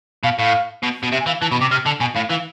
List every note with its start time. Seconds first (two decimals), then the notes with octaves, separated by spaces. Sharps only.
0.23 B2 F5
0.39 A2 F5
0.83 B2
1.03 B2
1.12 C3 E5
1.20 G#5
1.26 E3 F5
1.41 E3 A5
1.51 B2 B5
1.61 C3 D6
1.71 C3 F6
1.86 D3 A5
2.00 B2 G#5
2.15 A2 F5
2.30 E3 F5